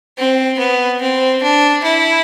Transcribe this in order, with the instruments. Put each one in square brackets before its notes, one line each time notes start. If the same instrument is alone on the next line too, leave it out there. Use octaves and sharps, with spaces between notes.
[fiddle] C4
B3
C4
D4
E4